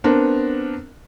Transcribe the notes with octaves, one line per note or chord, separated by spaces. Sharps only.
B3 C4 D4 A#4